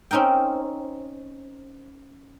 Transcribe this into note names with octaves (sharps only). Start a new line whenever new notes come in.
C4 C#4 D#4 A#4 G5